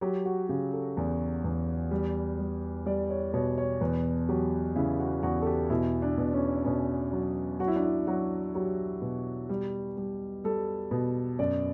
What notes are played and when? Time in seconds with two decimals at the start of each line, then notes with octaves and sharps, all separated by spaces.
0.01 F#3 G4
0.25 F#4
0.49 C#3 G4
0.73 A4
0.97 E2
1.44 E2
1.91 G3
2.39 G3
2.86 G3 D5
3.10 C#5
3.34 B2 C#5
3.58 C#5
3.81 E2 B4
4.29 F#3 G4
4.76 C#3 E4
5.00 F#4
5.23 E2 F#4
5.42 A4
5.46 G4
5.70 B2 E4
6.02 D4
6.18 B2
6.33 C#4
6.65 B2 C#4
7.12 F#3
7.60 F#3 F#4
7.68 E4
7.76 D4
7.83 E4
8.07 F#3 F#4
8.55 F#3 G4
9.02 B2
9.49 G3
9.97 G3
10.44 G3 A4
10.91 B2
11.39 F#2 D5